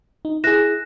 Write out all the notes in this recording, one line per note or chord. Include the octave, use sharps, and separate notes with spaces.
D#4
E4 G#4 F#6 A#6 E7